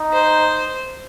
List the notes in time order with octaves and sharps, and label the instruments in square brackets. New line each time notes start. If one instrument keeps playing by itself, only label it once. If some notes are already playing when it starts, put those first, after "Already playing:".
Already playing: [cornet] D#4
[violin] C5